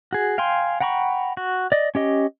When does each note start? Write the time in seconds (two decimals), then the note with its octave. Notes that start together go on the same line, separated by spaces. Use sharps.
0.13 F#4 G#4
0.38 F5 G5 G#5 C6
0.80 F#5 G5 A#5 B5 C#6
1.37 F#4
1.72 D5 D#5
1.95 C#4 G4 D#5